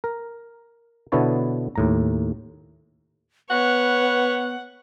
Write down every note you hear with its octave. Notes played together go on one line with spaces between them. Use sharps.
A#4
B2 D3 B3 E4 C#5 A5
D#2 A2 A#5
B3 B4 C#5 F#5